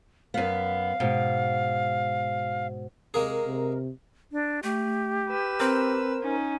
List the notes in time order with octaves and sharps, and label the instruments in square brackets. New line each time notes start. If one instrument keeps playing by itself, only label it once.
[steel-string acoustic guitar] F#2 B3 [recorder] F5
[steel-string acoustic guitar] G#2 B2
[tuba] C3 [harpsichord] G#3 A#3 G#4 [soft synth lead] A#4
[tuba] C3
[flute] D4
[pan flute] A3 [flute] G4
[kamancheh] B4 E6
[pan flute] C4 [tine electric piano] A#4 C5
[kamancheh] C#4 D#4